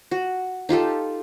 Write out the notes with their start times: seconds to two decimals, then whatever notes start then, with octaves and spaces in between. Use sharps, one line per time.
0.11 F#4
0.69 D#4 F4 G4 A4